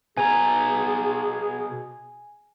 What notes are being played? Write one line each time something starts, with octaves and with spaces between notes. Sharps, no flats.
B2 G#4 G#5 A#5